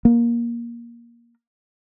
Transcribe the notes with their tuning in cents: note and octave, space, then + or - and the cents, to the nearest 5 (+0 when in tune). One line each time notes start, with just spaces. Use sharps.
A#3 +15